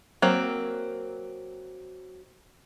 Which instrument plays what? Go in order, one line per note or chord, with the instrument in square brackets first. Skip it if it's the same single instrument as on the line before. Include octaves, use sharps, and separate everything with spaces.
[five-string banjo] F#3 A#3 C4